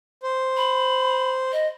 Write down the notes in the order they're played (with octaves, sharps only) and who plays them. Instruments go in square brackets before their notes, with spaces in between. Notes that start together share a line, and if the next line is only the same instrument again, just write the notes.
[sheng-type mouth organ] C5
[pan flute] B5
D#5